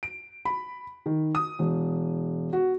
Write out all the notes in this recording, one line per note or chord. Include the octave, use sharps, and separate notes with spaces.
D7
B5
D#3
D#6
E1
F#4